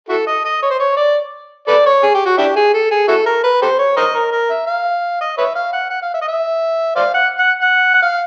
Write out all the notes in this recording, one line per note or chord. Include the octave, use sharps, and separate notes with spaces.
E4 F#4 A4
D#5
D#5
C#5
C5
C#5
D5
A4 B4 D5
C#5
G#4
G4
F#4
D4 E4 G4
G#4
A4
G#4
E4 F#4 A4
A#4
B4
G4 A4 C5
C#5
A#4 C5 D#5
A#4
A#4
E5
F5
D#5
B4 C#5 E5
F5
F#5
F#5
F5
E5
D#5
E5
C5 D5 F5
F#5
F#5
F#5
F#5
F5